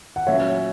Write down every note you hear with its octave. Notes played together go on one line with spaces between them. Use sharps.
F#5
A#2 F#3 C#4 C#5 E5